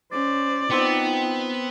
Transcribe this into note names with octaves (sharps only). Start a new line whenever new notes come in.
C#4 C5 D5
B3 C4 D#4 F4 C5 G5